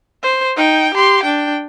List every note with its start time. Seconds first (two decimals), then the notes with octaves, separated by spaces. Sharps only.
0.23 C5
0.57 D#4 G5
0.94 G4 C6
1.23 D4 G5